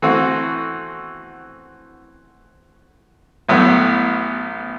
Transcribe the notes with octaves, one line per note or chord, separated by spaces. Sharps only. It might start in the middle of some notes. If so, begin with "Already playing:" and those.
E3 A3 C4 F#4
A1 A2 F#3 B3